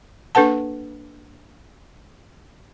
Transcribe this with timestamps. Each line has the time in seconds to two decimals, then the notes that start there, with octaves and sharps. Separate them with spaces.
0.35 A#3 D4 A4 B4 F#5 A5